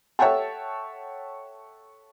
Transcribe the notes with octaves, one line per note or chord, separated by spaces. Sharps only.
A4 C#5 E5 F#5 G5 A5